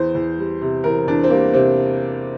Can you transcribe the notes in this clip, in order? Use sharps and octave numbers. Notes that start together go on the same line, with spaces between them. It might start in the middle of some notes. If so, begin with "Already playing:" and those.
Already playing: E2 C5
E2
G3
C3
E2 A#4
E2 D4
C4
G3 A#3
C3 C4